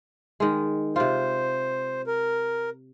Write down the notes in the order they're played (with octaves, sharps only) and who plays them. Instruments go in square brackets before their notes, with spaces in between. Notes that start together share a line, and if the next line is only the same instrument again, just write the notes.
[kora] D#3 G#3
[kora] C3 F4 [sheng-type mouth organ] C5
[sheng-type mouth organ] A#4